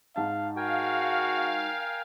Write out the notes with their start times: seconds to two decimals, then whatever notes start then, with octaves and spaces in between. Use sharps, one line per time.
0.16 G#2 F5 A5
0.57 F#4 A#4 F5 G5 G#5